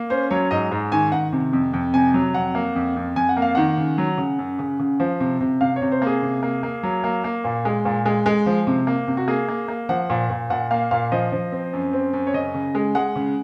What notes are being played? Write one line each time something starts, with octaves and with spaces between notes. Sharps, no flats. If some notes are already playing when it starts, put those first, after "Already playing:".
Already playing: A#3
C#4 C5
F#3 C#5
G#2 D#5
G#2
D#3 G#5
D#3 F#5
C3
F2
F2
C3 G#5
F#3
F2 F#5
A#3
F2
F2
F2 G#5
F#5
A#3
F5
D#3 F#5
C#3
F#3
C#3
F#2
C#3
C#3
F3
C3
C3
C3 F5
C#5
C3
C5
A#3 G#4
C3
A#3
A#3
F#3
A#3
A#3
A#2
G#3
A#2
G#3
G#3
F3
C3
A#3
C3
F#4
A#3 G#4
A#3
A#3
F3 F#5
A#2
A#2
A#2 F#5
A#3 F5
A#2 F5
F3 D#5
F3
C4
F#2
C4
F#2
C#5
C#3 D#5
C#3
G#3
G#3 F#5
C#3